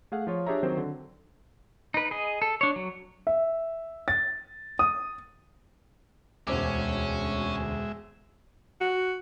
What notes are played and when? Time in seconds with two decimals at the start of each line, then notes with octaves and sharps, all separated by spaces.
0.12 A3 G#4 F5 F#5
0.27 F3 F4 C#5
0.46 D4 G4 G#4 C#5 E5 A#5
0.63 D#3 F#3 C4 C5
0.77 D3
1.94 D#4 B4
2.11 G#4 D#5
2.42 A4
2.61 D4 C#5
2.76 F#3
3.27 E5
4.08 A6
4.79 D#6
6.47 E1 D2 G#3 C#4 C5 E5 D6
8.81 F#4